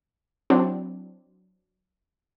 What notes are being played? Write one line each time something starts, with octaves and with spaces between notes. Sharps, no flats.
F#3 C4 D4 E4